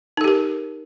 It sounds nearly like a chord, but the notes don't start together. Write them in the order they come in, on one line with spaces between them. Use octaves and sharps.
D#4 A4 G4 A#4